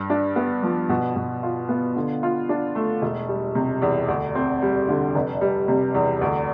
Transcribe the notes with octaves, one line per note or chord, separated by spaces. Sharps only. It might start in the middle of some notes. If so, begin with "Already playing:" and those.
Already playing: G2
D4
B3
F3
B2
B2
F4
B3
D3
F4
D4
A3
E1
G3
C3
E2
D2
C4
G3
D3
F1
G3
C3
E2
D2